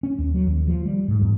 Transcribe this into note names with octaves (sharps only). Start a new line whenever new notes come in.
C#4
D#2
F#3
D#2
F3
G3
G#2
E2